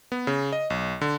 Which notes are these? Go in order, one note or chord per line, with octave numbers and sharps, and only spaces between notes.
B3
C#3
D#5
B1
D3